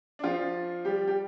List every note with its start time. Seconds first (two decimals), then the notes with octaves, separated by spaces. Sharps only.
0.19 D4
0.23 F3 F4
0.85 G3 G4
1.07 G4